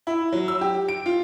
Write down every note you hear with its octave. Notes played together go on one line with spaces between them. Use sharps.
E4
F#3
E6
G4
D7
F4